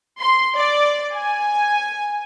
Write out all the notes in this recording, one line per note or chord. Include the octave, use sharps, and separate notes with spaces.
C6
D5
G#5